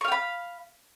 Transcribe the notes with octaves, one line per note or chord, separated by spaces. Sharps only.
F5 G5 B5 C#6